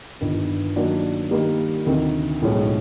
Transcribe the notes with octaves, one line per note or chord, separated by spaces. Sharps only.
G1 G2 D#3
D#3 F#3 A#3 D4
D#3 G3 A#3
D2 C3 D#3
B1 A2 F3 G#3 C#4